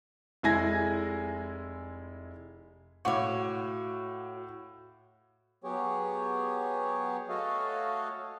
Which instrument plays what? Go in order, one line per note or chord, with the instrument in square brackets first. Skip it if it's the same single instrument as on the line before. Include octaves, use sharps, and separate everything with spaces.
[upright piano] F1 G#3 E4 G#5 G#6 A#6
[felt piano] A2 F5 D6 [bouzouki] F#4 C#5
[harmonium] F#3 B3 G4 G#4 C#5
A3 F#4 A4 C#5 D#5 F5